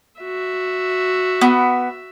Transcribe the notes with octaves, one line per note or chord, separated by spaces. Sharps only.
F#4 E5
B3